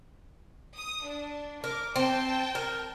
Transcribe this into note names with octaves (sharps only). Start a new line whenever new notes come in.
D#6
D4
A#4 D6
C4 G5 A5
A#4